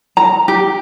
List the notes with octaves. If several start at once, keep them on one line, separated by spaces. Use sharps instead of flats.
A#5
G4